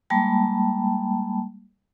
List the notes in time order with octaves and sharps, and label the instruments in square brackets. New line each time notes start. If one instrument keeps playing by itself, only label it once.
[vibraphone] G3 G#3 A#3 G5 A5 B5